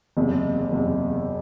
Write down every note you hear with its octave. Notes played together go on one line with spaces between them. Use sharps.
F#1 E2 C3
F#1 E2 C3